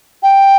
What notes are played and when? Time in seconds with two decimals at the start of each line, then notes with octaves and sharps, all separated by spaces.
0.23 G5